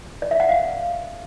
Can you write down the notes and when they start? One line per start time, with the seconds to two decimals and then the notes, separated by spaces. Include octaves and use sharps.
0.22 D5
0.31 E5
0.40 F#5
0.49 F5